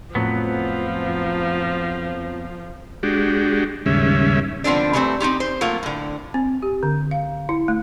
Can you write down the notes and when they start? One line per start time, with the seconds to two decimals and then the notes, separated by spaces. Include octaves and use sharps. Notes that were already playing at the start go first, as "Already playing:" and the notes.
0.15 F2 A2 F3 F#3 B3
3.03 G#3 D4 F#4 G4
3.86 D#2 G#2 C#3 G3 C#4 E5
4.64 D3 F3 B3 C4 D4
4.93 D3 E3 G3 A3 C4
5.20 C4 D#4 F4 G4
5.40 C5
5.61 F#3 A3 A#3 F4
5.83 A2 D3
6.34 C4
6.62 G4
6.83 D3
7.11 F5
7.49 E4
7.68 A3